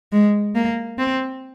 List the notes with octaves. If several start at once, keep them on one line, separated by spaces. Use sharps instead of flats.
G#3
A#3
C4